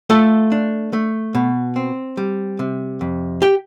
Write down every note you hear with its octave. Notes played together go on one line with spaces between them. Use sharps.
A3 F4 A4
D4
A3
B2
C4
G3
C3
F2
G4 G5